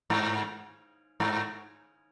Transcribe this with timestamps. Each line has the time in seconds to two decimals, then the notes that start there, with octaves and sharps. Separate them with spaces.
0.10 G#2
1.20 G#2